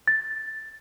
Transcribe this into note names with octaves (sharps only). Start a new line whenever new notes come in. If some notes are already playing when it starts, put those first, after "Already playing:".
A6